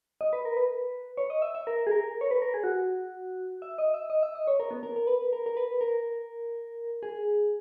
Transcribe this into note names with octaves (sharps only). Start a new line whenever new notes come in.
D#5
B4
A#4
B4
C#5
D#5
E5
E5
A#4
G#4
A#4
C#5
B4
A#4
G#4
F#4
E5
D#5
E5
D#5
E5
D#5
C#5
A#4
B3
A#4
A#4
B4
A#4
A#4
B4
A#4
G#4